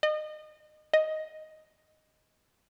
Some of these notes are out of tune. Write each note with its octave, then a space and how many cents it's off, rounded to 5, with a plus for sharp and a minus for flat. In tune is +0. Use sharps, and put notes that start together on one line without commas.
D#5 -25
D#5 +10